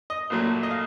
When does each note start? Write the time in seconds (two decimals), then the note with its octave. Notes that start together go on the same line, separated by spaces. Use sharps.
0.10 D#5
0.30 A#1 A#2 F#3 A3
0.63 D#5
0.71 F5